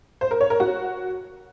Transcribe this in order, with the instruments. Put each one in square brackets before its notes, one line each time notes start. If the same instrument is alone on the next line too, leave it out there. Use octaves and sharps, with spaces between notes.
[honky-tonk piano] C5
A#4
C#5
A#4
F#4